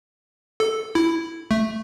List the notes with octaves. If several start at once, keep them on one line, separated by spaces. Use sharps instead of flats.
A4
E4
A3